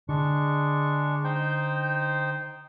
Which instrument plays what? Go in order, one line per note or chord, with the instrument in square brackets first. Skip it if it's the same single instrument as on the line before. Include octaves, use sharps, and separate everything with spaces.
[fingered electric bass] D3 [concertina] G#3 D4 C#6
[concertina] D#4 C5 G5